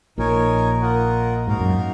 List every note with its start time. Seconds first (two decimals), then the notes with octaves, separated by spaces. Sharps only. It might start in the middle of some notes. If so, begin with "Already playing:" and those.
0.18 A#1 A#2 D#4 A#4 C#5 G#5
0.82 A#3 F4 A#4 D#5 F#5
1.47 G#2 A#3 D#4 F#4 A#4 F5
1.60 F#2